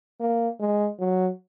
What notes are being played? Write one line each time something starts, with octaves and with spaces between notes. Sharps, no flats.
A#3
G#3
F#3